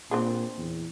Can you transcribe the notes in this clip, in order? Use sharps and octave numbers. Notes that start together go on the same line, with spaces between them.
A#2 C4 D4 G#4
E2